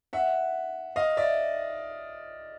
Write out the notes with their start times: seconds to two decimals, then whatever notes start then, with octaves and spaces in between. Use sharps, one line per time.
0.13 E5 F#5
0.96 D#5 F5
1.17 D5 E5